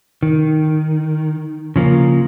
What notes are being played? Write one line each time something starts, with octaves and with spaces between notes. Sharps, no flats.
D#3
C#3 F3 A#3